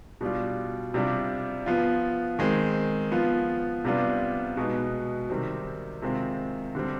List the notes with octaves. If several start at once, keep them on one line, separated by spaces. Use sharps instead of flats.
B2 G3 D4 F4
C3 G3 D4 F4
F3 B3 F4
D#3 G#3 C4
F3 B3 F4
C3 G3 B3 D4 F4
B2 G#3 B3 D#4
C3 D#3 G3 C4
C3 D#3 G#3 C4 F4
D3 G3 C4